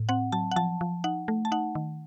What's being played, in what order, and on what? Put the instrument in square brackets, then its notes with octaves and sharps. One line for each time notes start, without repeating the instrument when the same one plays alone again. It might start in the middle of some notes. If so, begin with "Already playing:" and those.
Already playing: [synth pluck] A2
C4 F#5
F#3 A5
F#5
F3 A5
F3
D#4 F#5
A3
A5
D#4 F#5
D#3